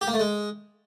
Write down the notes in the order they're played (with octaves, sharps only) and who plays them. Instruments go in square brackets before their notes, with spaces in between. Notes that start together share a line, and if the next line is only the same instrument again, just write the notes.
[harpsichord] G4
A#3
A3
G#3